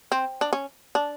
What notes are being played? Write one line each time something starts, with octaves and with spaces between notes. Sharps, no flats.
C4
D4
C#4
D4